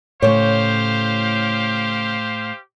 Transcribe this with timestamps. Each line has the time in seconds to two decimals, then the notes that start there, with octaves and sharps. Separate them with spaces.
0.22 A2 C#3 A3 G4 C5 C#5 F5